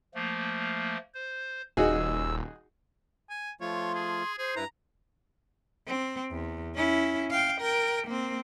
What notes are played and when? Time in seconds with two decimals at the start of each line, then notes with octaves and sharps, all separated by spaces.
0.15 F3 A3 A#3
1.14 C5
1.77 D#1 D#4 F#4 G#4 E6
3.30 G#5
3.61 F3 A3 F4 C#5
3.73 C6
3.94 G#4
4.38 G#4 C5
4.56 G2 E4 B4 A#5
5.88 C4
6.32 E2
6.76 C#4 E4
7.31 F5 G5
7.61 A#4 G5
8.07 A#3 C4